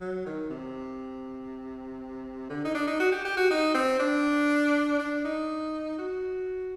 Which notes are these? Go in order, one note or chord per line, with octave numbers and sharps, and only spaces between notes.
F#3
D#3
C3
D3
D#4
D4
D#4
F#4
G4
G4
F#4
D#4
C4
D4
D4
D#4
F#4